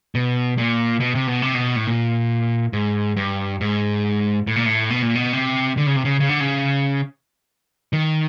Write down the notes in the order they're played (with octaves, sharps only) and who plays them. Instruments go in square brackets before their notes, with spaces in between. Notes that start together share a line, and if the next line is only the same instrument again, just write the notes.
[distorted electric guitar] B2
A#2
B2
C3
B2
C3
B2
A2
A#2
G#2
G2
G#2
A2
A#2
A2
B2
A#2
B2
C3
D3
C#3
C3
C#3
C#3
D3
C#3
D#3